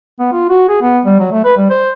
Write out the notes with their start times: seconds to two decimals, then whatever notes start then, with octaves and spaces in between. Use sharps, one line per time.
0.20 B3
0.33 F4
0.49 F#4
0.69 G#4
0.82 B3
1.05 G3
1.19 F#3
1.32 A3
1.45 B4
1.57 G3
1.70 C5